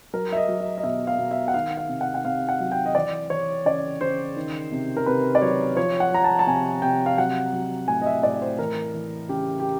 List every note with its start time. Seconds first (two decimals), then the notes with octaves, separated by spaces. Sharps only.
0.13 F#3 A#4
0.32 E5
0.37 D#5
0.48 F#3
0.60 D#5
0.78 D#5
0.84 B2 E5
1.07 F5
1.19 B2
1.31 E5
1.48 F#5
1.54 D#3 F5
1.77 F5
1.89 C3
2.01 F#5
2.15 F#5
2.25 C3 F5
2.49 F#5
2.60 F#3
2.72 G5
2.86 D#5
2.95 E3 D5
3.30 E3 C#5
3.65 C#3 D5
4.01 C#3 C5
4.36 D#3
4.72 C3
4.97 A#4
5.06 C3 B4
5.35 D5
5.42 F#3 C#5
5.76 F3 C#5
6.00 F#5
6.12 F3 A#5
6.24 A5
6.39 A5
6.47 C3 G#5
6.82 C3 G5
7.06 F5
7.18 F#3 F#5
7.53 F#3
7.88 A2 G#5
8.02 D#5
8.06 E5
8.23 A2 D5
8.41 C5
8.58 E3 A#4
8.94 E3
9.29 C#3 G4
9.60 G4